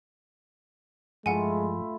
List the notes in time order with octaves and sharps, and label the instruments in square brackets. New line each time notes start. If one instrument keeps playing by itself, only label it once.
[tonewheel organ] G2 F3 [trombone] G#3 [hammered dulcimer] A3 E4 F4 [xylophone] F#5 G#5